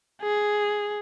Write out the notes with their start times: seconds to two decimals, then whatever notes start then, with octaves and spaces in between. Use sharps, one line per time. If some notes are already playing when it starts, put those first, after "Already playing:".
0.22 G#4